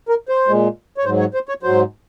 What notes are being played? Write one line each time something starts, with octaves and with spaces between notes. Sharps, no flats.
A#4
C5
A#2 G#3
C#5
G#2 F#3 C5
C#5
C5
C#5
G#2 F#3 C5